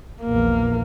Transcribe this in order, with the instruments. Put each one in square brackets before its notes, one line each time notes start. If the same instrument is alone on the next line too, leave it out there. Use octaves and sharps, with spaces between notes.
[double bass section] A#1 E2 [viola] A#3